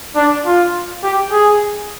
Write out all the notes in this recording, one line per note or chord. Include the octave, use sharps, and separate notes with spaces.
D4
F4
G4
G#4